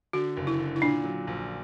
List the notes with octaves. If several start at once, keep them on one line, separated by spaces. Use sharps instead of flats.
D3 F#4
F#1
E4
D3
E4
A#2 D4
F#3
A#1